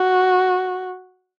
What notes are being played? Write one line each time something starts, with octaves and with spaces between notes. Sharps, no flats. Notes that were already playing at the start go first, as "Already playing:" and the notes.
Already playing: F#4